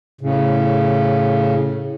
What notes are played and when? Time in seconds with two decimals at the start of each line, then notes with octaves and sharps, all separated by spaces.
0.21 A2 C#3